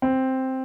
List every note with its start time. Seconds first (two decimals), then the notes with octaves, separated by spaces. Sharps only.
0.02 C4